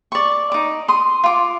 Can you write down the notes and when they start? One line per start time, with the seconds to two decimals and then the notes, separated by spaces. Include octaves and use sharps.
0.12 D5 C#6
0.52 D#4 D6
0.88 C6 D#6
1.24 F4 D6